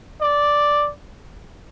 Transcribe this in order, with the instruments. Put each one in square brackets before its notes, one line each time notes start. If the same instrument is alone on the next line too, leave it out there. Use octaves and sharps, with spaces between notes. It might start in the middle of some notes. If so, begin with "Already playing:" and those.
[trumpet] D5